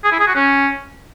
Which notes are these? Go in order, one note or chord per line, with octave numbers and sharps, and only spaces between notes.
G#4
E4
G#4
F#4
C#4